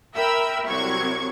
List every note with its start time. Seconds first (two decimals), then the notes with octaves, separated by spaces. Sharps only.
0.15 A#4 E5 G5 B5 E6
0.68 C2 F#3 C4 C#6 G#6